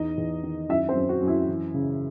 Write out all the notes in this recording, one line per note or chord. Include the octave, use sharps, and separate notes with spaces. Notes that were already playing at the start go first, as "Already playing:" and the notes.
Already playing: E2 D#4 D#5
E2
D#3
F#2 E4 E5
C4 C5
F#2
F#4
F#2
E4
E3
C#3